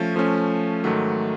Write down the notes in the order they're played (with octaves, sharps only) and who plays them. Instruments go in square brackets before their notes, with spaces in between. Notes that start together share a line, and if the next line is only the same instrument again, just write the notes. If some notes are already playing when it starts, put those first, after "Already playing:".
Already playing: [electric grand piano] F3 A3 C#4
F3 A3 C#4
G#2 D#3 F#3 A3